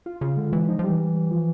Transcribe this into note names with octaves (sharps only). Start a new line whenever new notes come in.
F4
C#3 F4
D3 G#3
E3 G#3
F3 D#4
F3
E3 G3
G3
G3
F3